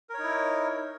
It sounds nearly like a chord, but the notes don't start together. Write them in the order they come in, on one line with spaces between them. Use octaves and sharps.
A#4 C#5 D#4 E4